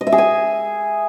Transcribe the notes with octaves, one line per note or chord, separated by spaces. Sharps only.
D#5
E5
G#4
G#5